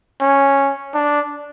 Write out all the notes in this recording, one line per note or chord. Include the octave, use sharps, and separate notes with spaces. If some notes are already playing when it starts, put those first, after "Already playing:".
C#4
D4